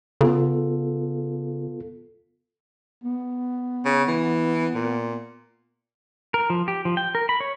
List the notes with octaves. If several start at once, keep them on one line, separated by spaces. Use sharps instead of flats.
C#3 B3 F4 A4
B3
C#3
E3
A#2
A#4
F3
G4
F3
G5
A#4
B5
C#5